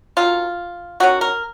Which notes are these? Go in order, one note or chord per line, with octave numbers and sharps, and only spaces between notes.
D#3 F#3 C#4 F4
D#3 F#3 C#4 F#4
A#4